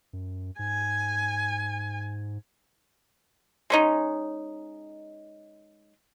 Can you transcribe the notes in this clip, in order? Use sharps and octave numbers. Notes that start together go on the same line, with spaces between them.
F#2
G#2 G#5
G#3 C#4 D#4